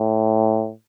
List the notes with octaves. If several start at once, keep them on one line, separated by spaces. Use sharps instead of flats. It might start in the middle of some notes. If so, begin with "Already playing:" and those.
Already playing: A2